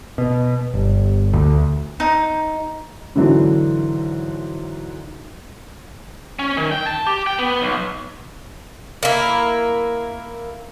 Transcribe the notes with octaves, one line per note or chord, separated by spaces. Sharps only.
B2
G1
D2
D#4
G#2 D3 E3 F#3 D4
C#4
D#3
G5
A5
G4
G5
B3
B1
A#3 E4